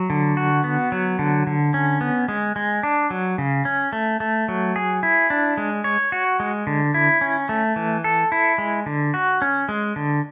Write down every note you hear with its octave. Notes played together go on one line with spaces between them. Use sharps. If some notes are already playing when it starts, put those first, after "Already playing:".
Already playing: F#3
D3
F#4
B3
F#3
D3
D3
C#4
B3
G#3
G#3
D4
F#3
C#3
C#4
A3
A3
F#3
G#4
E4
D4
G#3
C#5
F#4
G#3
D3
E4
C#4
A3
E3
A4
E4
G#3
D3
F#4
C#4
G#3
D3